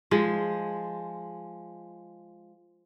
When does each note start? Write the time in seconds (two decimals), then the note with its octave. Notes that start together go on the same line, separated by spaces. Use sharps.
0.11 F3 G#3